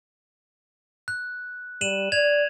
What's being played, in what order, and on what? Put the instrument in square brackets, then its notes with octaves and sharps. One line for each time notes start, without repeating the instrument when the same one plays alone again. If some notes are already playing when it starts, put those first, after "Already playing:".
[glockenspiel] F#6
[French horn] G3 [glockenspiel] D#7 E7 F#7
[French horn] D5 [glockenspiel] G#6 F7